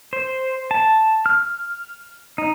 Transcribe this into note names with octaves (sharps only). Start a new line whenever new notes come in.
C5
A5
F6
D#4